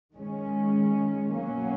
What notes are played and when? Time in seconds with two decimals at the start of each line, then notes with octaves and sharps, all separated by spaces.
0.14 D#3 G#3 C#4
1.33 B2 F#3 A#3 C#4